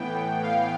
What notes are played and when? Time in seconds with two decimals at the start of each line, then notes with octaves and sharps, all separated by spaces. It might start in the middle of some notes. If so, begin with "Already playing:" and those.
Already playing: A2 E3 B3 G5
0.44 F5